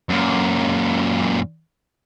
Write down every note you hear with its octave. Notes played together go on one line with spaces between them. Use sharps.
F#2 A#2